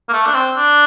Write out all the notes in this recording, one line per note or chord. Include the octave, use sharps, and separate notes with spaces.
A#3
A3
D4
C4
D4